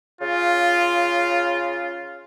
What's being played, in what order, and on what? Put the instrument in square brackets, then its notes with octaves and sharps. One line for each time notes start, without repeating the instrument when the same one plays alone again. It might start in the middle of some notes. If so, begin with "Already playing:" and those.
[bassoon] C#3 [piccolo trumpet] F4